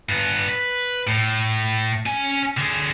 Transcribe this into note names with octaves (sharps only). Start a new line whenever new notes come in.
G2 B3
B4
A2
C#4 G#5
D3 G#4